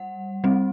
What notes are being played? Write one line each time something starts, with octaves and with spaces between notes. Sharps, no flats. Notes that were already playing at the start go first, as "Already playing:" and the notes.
Already playing: G3 F#5
G3 C4